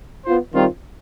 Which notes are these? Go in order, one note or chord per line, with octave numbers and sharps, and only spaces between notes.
B3 F4 C5
D#3 G3 C4 F4